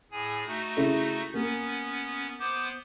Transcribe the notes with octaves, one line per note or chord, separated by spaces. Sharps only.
A2 G#4 G#5
A3 D#4 F#4
C#3 E4 A4
A#3 B3 C#4
B3 C5 D6